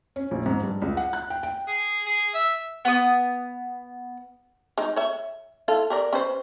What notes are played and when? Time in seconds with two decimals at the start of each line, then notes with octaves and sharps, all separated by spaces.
0.16 C#4
0.31 A#1
0.46 G#2
0.63 G2
0.82 C#2
0.97 F#5
1.13 F#6
1.30 G5
1.43 G5
1.67 G#4
2.06 G#4
2.35 E5
2.85 B3 D#6
4.78 G#3 D#4
4.96 C#5 E5
5.68 E4 F4 A4
5.90 G4 A#4 D5
6.13 C#4 B4 C5